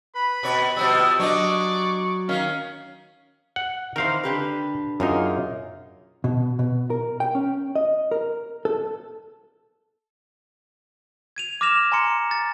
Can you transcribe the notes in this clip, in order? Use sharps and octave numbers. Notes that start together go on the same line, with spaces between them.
B4 B5
B2 C#5
B2 F3 G3 E6
F#3 D4 D5 D#5 C#6
D#3 C#4 F5
F#5
D#3 E3 A#4 C5 F5
D3 G4 B4
F#2 A#3 D#4 F4 G#4
B2
B2
A#4
G5
C#4
D#5
A#4
A4
G#6 D#7 F7
D6 F6 A#6 E7 F7
G#5 A#5 C6 C#7
A6